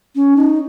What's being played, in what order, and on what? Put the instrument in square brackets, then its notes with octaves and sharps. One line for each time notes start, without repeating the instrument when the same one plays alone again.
[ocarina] C#4
D#4